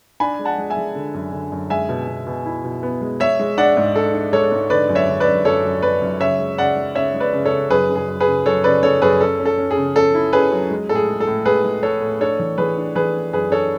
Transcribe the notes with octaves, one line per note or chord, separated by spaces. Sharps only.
D4 G#5 B5
G#3
F#5 A5
G#3
E5 G#5
G#3
D3
F#2
D3
F#2
G#3 E5 G#5
B2
B2
B2
E4
B2
B3
G#3
G#3 C#5 E5
G#3
D4 D5 F#5
G#2
D4 A4
D4
G#3 A4 C#5
G#2
D3 B4 D5
F#2
C#5 E5
D3
B4 D5
F#2
F#2 A4 C#5
F#2
F#2 B4 D5
F#2
C#3 C#5 E5
G#3
C#3 D5 F#5
G#3
C#3 C#5 E5
G#3
B4 D5
C#3
A4 C#5
C#3
F#2 G#4 B4
C#3
G#4
F#2
G#4 B4
C#3
F#2 A4 C#5
C#3 B4 D5
C#3 A4 C#5
F#2 G#4 B4
C#4 A4
C#4
A4
C#4
G#4
C#3
C#4 A4
E4
C#4 G#4 B4
F#3
G#3
A2 A4
G#4
G#3
A4
A2
G#3 G#4 B4
G#3
G#3 A4 C#5
A2
D4 A4 C#5
E3
E3 G#4 B4
D4
E3 G#4 B4
D4
F#2 G#4 B4
D4 A4 C#5